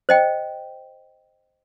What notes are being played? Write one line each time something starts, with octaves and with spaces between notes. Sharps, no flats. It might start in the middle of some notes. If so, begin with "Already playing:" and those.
C5 D#5 G5